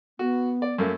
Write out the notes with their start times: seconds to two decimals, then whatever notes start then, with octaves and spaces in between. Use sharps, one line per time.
0.19 B3 F#4
0.62 D5
0.78 F#2 A3 A#3